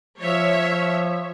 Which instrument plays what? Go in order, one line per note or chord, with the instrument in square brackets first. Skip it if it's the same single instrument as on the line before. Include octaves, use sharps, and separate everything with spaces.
[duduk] F3 [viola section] C#5 E5